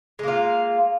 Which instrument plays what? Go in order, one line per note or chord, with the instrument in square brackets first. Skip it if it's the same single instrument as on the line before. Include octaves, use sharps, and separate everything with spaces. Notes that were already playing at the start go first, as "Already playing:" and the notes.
[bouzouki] G#3
A#3
F4